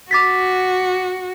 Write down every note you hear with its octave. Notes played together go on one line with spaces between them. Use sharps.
F#4 D6 A6 B6